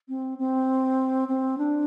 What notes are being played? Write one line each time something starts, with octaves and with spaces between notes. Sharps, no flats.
C4
C4
C4
D4